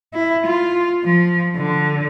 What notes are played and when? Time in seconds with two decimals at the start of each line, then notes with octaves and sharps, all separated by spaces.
0.14 E4
0.46 F4
1.04 F3
1.56 D3